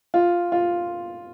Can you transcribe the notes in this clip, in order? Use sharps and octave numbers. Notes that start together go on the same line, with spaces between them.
F4
F4